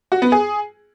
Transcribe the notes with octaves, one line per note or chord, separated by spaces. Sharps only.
F#4
B3
G#4